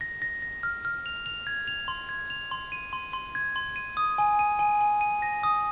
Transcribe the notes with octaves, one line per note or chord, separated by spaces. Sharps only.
A#6
A#6
A#6
F6
F6
F7
F7
G#6
F7
C6
G#6
F7
C6
D#7
C6
C6
G#6
C6
D#7
D#6
G#5
D#7
G#5
G#5
D#7
A#6
D#6